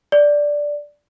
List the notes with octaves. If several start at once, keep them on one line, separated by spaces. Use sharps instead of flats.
D5